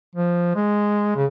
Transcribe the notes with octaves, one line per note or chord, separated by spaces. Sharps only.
F3
G#3
C#3